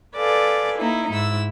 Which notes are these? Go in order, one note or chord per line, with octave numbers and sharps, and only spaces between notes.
A4 B4 D5 F5 G#5
A#3 D#4 E4
G#2 E4 E6